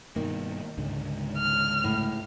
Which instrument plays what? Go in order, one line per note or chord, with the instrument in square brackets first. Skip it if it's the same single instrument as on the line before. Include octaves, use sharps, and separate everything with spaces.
[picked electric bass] G2 B2 A#3 [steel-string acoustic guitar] D#3
[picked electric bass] C#2 G#2 D3
[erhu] F6
[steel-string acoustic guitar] A2